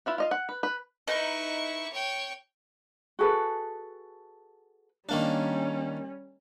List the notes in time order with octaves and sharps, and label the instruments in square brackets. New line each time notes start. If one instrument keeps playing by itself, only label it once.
[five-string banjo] E4 F4 B4
F4 D#5 F5
F#5
B4
B4
[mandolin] D#4 B4 [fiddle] E4 C#6
[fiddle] C#5 G5
[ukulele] F#4 G#4 A4 B4
[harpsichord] D#3 A#3 D4 [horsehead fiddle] G3 C#4